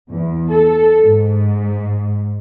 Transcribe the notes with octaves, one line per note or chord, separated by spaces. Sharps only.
E2
A4
G#2